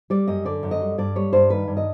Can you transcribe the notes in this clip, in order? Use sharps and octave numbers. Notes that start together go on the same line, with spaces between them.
G3 D5
F#2 D#5
D3 D5
F#2
D#5
G3
G2 D5
G3 C#5
G2 C5
D#3 B4
G2
D#5